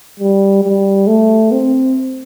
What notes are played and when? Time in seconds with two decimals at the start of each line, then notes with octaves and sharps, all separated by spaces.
0.20 G3
0.63 G3
1.07 A3
1.52 C4